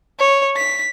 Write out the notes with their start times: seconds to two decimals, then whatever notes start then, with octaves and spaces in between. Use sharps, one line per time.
0.19 C#5
0.56 B6